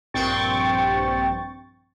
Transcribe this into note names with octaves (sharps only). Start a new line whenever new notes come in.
A#1 G2 C4 G5 C#6 A6